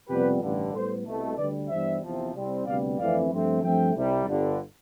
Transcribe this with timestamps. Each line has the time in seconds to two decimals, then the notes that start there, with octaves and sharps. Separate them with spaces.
0.09 F2 C3 G3 B3 G4 B4
0.41 A1 G2 D3
0.73 A2 G3 B3 A4 C5
1.05 C2 B2 A3
1.37 D2 D3 G3 B4 D5
1.69 G2 E3 G3 B3 C5 E5
2.01 E2 C3 F3 C4
2.34 C2 C3 G3 C4
2.66 D2 C3 G3 B3 D5 F5
2.98 G1 F2 E3 A3 C4 D5 F5
3.30 G2 F3 A3 C4
3.62 G2 F3 A3 C4 E5 G5
3.94 C2 C3 G3
4.27 G1 G2 D3